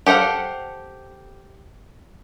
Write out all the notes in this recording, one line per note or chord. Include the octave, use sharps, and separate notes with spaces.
G4 A4 C5 F5 F#5